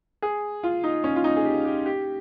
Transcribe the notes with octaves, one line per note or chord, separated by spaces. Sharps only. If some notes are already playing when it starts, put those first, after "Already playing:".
G#4
F4
D#4
C#4
F4
D#4
G#4
G4
G4
G4